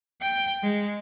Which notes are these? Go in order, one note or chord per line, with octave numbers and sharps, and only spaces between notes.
G5
G#3